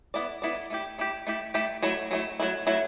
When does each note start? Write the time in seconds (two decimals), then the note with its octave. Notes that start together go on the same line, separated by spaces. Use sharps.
0.14 B3 E4 A4 D5
0.42 B3 E4 A4 D5
0.70 A3 E4 G4
0.98 A3 E4 G4
1.27 A3 E4 G4
1.54 A3 E4 G4
1.83 F#3 A3 E4
2.11 F#3 A3 E4
2.40 F#3 A3 E4
2.67 F#3 A3 E4